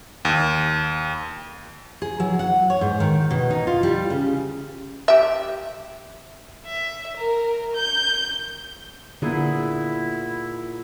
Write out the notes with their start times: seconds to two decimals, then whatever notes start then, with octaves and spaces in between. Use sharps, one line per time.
0.25 D#2
2.02 G#4
2.20 F#3
2.39 F#5
2.70 C#5
2.81 G#2
3.00 D#3
3.30 B2
3.50 D#4
3.67 F4
3.83 G3
4.10 C#3
5.08 G4 E5
6.66 E5
7.17 A#4
7.75 G6
9.22 A#2 D3 B3 E4 G#4 F#5